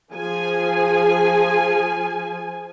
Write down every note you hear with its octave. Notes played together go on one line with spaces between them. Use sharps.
F3 G#4 G#5